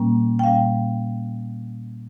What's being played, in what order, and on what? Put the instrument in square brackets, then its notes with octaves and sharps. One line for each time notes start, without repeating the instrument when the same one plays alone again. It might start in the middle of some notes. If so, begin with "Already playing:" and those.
Already playing: [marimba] A#2 G3 A#3 C#4
G5
A#2 G3 C#4 F5